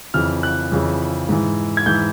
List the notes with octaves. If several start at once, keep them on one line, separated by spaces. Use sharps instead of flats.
F2 C#3 E3 F6
F#6
F2 C#3 E3
G#2 E3
G#6
G#2 E3 G6